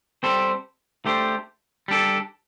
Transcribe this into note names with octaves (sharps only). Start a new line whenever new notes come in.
G3 C4 A4 C5
A3 D4 G4 C5
G3 D4 A4